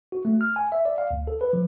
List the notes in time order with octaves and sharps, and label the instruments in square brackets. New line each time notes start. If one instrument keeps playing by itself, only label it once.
[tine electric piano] F#4
A3
F6
G#5
E5
D5
F5
D2
A4
B4
F3